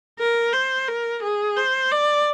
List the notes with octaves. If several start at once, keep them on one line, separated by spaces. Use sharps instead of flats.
A#4
C5
A#4
G#4
C5
D5